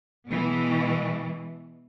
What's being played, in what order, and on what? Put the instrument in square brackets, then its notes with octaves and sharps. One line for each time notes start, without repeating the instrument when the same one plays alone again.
[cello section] B2 E3 G#3 B3